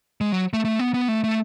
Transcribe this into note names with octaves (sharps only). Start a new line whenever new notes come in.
G#3
F#3
A3
A3
B3
B3
A3
A3